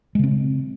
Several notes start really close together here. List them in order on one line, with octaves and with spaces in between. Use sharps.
G#3 C#3 C4